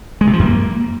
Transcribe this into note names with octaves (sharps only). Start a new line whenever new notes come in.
G#3
C3
F3
F#2
A#3